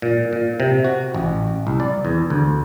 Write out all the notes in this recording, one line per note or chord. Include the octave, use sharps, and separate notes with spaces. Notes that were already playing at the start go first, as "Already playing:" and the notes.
A#2
A#2
C3
F#4
A1
C2
D5
E2
D2